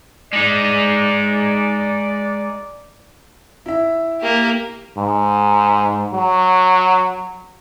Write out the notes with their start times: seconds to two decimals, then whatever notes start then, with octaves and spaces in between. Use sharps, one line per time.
0.33 G#3 D#4 D5
3.66 E4 E5
4.22 A#3 G4
4.98 G#2
6.13 F#3